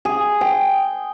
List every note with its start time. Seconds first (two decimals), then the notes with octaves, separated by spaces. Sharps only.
0.05 G#4
0.41 G5